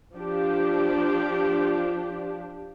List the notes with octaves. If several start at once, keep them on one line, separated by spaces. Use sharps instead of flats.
F3 D4 G4